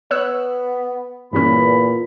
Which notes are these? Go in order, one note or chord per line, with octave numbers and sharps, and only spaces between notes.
B3 C#5 E6 F#6
E2 G2 A#2 E3 C#4 B5